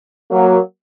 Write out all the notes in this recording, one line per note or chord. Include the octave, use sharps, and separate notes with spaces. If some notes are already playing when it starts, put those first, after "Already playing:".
F#3 A#3